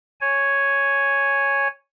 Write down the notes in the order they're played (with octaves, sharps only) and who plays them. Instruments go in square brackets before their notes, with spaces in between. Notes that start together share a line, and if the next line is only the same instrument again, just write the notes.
[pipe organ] C#5 G#5